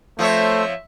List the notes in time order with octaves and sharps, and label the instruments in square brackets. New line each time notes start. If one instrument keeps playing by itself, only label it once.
[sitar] F3 C4 C#5 [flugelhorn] A3 [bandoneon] C5 [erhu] E5